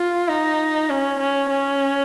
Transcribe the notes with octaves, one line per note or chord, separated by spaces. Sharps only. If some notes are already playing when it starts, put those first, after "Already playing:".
Already playing: F4
D#4
C#4
C#4
C#4